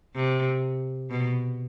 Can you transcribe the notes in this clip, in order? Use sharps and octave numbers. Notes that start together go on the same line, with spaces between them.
C3
B2